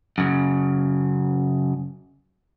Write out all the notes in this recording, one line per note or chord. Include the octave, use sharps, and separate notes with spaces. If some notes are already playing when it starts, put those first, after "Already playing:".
F#2 C#3